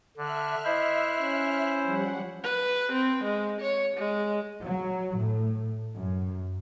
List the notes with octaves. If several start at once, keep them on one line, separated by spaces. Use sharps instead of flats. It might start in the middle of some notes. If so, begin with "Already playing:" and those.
D3 E5 F6 F#6
E4 C5 D#5
C#4
F3 G3 F#5
B4
C4
G#3
C#5
G#3
F#3
A2
F#2